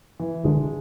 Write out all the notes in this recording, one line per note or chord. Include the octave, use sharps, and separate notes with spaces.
E3
D3 G#3